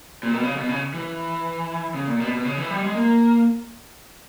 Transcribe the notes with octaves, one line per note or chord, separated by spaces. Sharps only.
A#2
B2
C#3
B2
C#3
E3
C#3
A#2
B2
B2
C#3
E3
G3
G#3
A#3